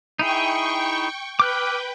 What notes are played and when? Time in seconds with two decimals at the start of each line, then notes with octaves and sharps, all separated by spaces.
0.19 D#4 E4 G#4 G5 C#6
1.40 B4 G5 D6 F6 F#6